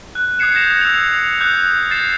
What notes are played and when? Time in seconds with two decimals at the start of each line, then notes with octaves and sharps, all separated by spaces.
0.15 F#6
0.39 D#6 F#6 G#6 C7 C#7 E7
0.54 G6 G#6 A#6 E7 F7
0.81 D#6 E6 F#6 C#7 F7
1.40 D#6 F#6 G6
1.90 G6 A6 C7 E7